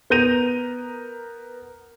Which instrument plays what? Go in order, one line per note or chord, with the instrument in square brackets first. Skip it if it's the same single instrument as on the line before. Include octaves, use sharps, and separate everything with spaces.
[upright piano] B3 A#4 G6 A#6 D#7 F7